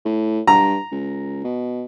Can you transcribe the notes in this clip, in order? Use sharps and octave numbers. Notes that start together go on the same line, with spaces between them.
A2
G2 A#5
C#2
B2